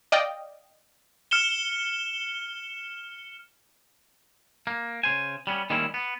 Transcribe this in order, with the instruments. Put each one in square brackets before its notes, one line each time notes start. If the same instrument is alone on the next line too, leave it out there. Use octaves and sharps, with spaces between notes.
[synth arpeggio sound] D5 D#5 F5 G5
[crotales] F6 C#7 E7 G7
[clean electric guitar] A#3
C#3 C5 G#5
G3 B3 C#4
D#3 G3 G#3 A#3 C#4 E4
B3